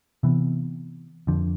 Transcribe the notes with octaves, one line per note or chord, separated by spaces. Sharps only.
C3 E3 B3
F2 D3 F3